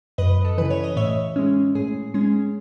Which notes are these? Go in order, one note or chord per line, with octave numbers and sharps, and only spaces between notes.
F#2 B4 D#5
A4
C#3 E3 B4
C#5
D#5
A2 C#5 E5
G#3 C#4
A2 G#4
G#3 C#4 G#4